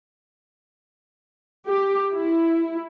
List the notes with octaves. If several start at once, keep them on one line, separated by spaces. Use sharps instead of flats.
G4
E4